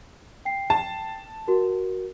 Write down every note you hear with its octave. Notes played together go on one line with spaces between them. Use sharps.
G5 C7
A5
F#4 A#4